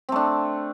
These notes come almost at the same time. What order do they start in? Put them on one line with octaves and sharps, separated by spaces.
C4 A3 D4